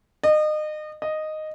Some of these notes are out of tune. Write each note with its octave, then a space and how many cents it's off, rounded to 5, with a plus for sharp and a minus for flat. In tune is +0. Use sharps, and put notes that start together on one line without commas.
D#5 -30
D#5 -5